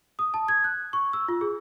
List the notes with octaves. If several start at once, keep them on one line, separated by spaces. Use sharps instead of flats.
D#6
A5
G#6
F#6
C#6
E6
F4
G#4